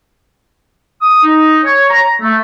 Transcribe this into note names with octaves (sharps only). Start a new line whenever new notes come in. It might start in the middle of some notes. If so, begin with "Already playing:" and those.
D#6
D#4
C#5
A#5
A3